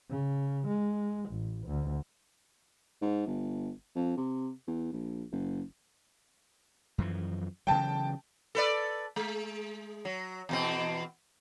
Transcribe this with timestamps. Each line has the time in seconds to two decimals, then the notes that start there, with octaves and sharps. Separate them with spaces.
0.10 C#3
0.67 G#3
1.30 A1
1.67 D2
3.02 G#2
3.27 G1
3.96 F2
4.17 C3
4.67 E2
4.92 A#1
5.32 F#1
6.98 F#2 E3 F3
7.67 C#3 E3 F#3 G5 A5
8.55 A4 B4 D5
9.16 G#3
10.05 F#3
10.49 E2 B2 C4